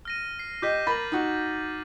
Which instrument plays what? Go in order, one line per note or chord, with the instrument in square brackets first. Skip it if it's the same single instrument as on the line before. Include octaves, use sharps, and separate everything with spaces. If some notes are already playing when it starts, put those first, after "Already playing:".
[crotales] F6 A#6 D#7
C7
[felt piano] G4 D#5 [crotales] D6 G6 B6
[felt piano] A#4 B5 [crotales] A6 F#7
[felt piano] D#4 F#4